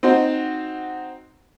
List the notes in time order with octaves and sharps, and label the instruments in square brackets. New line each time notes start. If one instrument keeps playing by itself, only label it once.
[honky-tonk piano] C4 D#4 F#4 C5